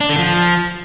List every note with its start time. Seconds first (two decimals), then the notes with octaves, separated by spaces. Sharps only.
0.01 D4
0.09 D3
0.18 F3